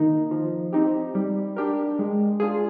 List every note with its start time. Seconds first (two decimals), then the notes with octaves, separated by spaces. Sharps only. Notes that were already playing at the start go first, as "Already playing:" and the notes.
Already playing: D#3 A#3 D#4
0.31 F3
0.73 C4 D#4 G4
1.15 G3
1.56 D4 G4 A#4
1.99 G#3
2.40 D4 F4 G#4